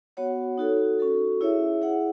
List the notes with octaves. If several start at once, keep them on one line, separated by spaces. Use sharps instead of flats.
B3 F#4 C#5 F#5
D#4 F#4 A4
C#4 F#4 A4
E4 G#4 C#5 E5
E4 G#4 C#5 F#5